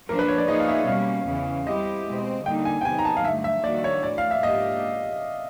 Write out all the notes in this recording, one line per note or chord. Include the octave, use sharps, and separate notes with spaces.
F3 A#3 D4 A#4
B4
C#5
D5
F3 A#3 D#4 G#4 C#5 D#5
F5
E5
B2 G3 A#3 C#4 F5
E2 C#3 E3
G3 C4 E4 G4 D#5
B2 G#3 C4
D3 G3 A#3 D#4 G5
G#5
G5
C3 D#3 F#3 B3 D#4 G#5
A#5
A5
F5
G2 D3 F#3 A3 E5
E5
D#3 G3 A#3 D4 F#4 D5
C#5
A2 E3 A3 D5
F5
E5
G#2 F3 A#3 D4 G4 D#5